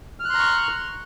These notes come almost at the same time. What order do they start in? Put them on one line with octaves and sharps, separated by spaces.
F6 F#6 C6 A#5 C#6